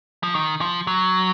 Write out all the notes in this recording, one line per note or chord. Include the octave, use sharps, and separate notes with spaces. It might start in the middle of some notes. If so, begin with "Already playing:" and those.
F3
D#3
F3
F#3